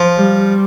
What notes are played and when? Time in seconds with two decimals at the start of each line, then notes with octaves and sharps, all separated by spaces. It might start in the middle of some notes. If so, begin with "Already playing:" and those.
Already playing: F3
0.17 G3